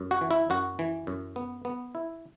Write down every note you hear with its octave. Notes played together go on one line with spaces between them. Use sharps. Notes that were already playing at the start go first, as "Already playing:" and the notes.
Already playing: F#2
F#4
E3
E4
F#2 F#4
E3
F#2
B3
B3
E4